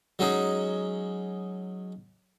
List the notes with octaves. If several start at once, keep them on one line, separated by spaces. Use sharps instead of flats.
F#3 G#3 C#4 D#4 G#4